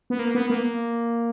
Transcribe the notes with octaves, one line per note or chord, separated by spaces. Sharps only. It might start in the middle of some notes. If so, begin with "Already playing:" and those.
B3
A#3
B3
A#3